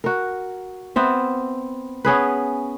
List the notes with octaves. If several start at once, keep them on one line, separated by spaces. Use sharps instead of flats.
F#4 A#4
B3 C4 E5
B3 C#4 G#4 B4